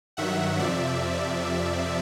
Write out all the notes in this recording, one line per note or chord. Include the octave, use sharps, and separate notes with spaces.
G2 D#3 F#3 E5 F#5
F2 C3 F3 D5 E5